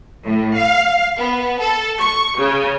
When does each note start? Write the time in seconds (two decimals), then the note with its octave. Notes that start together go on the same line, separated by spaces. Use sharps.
0.24 A2
0.57 F5
1.16 B3
1.59 A4
2.00 C#6
2.39 C#3